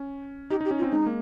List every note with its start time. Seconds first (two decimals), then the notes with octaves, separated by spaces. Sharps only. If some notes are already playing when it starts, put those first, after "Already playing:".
Already playing: C#4
0.50 D#4 G4
0.61 D#4 G4
0.71 C#4
0.79 F4
0.82 C4
0.91 G#3 D#4
1.06 A#3